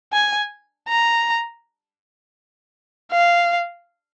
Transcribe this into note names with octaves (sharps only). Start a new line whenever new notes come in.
G#5
A#5
F5